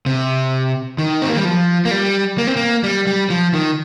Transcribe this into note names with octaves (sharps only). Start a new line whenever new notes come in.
C3
D#3
C4
A#3
G3
F3
A#3
G3
A#3
C4
A#3
G3
G3
F3
D#3